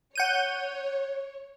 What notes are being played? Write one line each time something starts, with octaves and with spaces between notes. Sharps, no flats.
C#5 F#5 G6 D#7